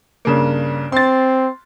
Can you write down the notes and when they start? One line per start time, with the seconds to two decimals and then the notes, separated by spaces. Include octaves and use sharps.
0.25 G2 C#3 A#3
0.92 C4 C6 A6